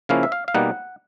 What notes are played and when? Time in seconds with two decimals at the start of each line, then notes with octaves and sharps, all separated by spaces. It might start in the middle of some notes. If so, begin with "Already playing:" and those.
0.09 C#3 F3 A#3 C#4 E4 F5
0.23 E5
0.32 F5
0.48 F5
0.54 B2 G3 A#3 D#4 F#5